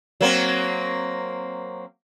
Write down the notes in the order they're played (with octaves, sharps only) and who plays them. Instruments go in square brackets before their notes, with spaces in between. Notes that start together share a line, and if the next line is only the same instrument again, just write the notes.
[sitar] F#3 A#3 C4